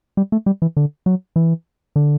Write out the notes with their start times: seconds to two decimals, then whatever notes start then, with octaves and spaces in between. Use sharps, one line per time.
0.17 G3
0.32 A3
0.46 G3
0.62 E3
0.77 D3
1.06 F#3
1.36 E3
1.96 D3